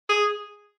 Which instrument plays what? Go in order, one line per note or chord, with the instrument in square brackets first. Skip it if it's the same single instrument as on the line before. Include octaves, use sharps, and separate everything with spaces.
[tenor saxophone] G#4